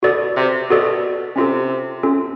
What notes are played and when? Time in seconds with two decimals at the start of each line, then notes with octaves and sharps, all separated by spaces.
0.03 B2 F#4 A4 D5
0.36 C3
0.70 B2 F#4 A4 D5
1.36 C3 C#4 F4 A4
2.03 C#4 F4 A4